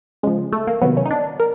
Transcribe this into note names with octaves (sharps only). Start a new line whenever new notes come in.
C#3 F3 G#3
A3
A#3
C3 D#3 F#3 B3
C#4
D#4
D4
A#4